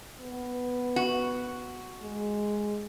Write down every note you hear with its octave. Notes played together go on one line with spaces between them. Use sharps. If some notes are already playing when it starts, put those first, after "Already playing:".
B3
F#4
G#3